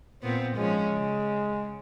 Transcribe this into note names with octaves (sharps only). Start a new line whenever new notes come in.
A#2 B3 C4 C5
G#2 F3 G#3 C#4
C#3